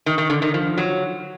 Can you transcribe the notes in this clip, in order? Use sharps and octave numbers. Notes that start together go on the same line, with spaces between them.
D#3
D#3
D3
D#3
F3
F#3